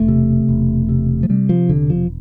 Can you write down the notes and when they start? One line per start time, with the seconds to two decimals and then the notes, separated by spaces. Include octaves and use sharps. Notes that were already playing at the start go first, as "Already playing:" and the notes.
Already playing: E1 A3
0.08 C3
0.49 E1
0.89 C3
1.23 F3
1.29 C3 G3
1.49 F3
1.69 E1 D3
1.90 F3